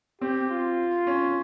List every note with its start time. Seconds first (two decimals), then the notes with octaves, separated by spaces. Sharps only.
0.21 C4 G4
0.50 F4
1.07 C#4